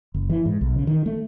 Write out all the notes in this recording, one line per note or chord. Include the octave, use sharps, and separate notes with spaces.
F#1
E3
G#2
B1
C#3
D#3
A3